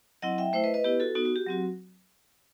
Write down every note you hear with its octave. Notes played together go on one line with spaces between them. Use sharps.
F#3 C4 E4 D#5 F#5
E5 G5
A3 E4 C5 E5
B4 D#5
B4 D#5
B3 E4 G4 B4
F#4 A4
B3 D#4 F#4
F#4
G4
F#3 C4 F#4